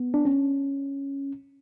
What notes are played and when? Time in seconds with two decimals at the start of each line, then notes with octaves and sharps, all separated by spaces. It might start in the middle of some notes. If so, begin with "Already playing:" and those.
Already playing: B3
0.14 D4
0.25 C#4